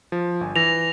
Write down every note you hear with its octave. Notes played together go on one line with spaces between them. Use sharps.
F3
G1 G#5
E3 A#6 F7